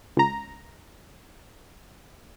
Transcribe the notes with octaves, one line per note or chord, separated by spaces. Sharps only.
C#2 A#5